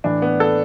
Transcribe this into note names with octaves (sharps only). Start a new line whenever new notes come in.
A2 E3 D4
B3
A4